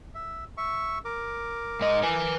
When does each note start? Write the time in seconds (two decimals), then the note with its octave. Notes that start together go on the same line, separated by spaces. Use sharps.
0.15 E5
0.57 E5 C#6
1.05 A#4 D6
1.81 G#2 D#5
2.04 B4 G#5